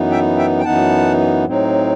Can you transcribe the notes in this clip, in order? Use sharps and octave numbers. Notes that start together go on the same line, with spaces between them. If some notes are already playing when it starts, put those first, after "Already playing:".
Already playing: F#2 E3 B3 D#4
E5 G5
E5 G5
G5
F#2 E3 B3 D#4 F#5 A5
A2 F#3 C4 D#4